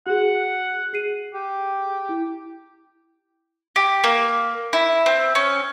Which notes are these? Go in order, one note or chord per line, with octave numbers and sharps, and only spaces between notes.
F#4 G#4 F#5
G#4 C7 D#7
G4
E4
G4
A#3
E4
C4
C#4